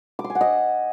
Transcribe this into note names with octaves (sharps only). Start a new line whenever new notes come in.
D6
C6
G#5
F#5
D#5